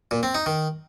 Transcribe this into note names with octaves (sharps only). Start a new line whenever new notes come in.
A#2
C4
D#4
D#3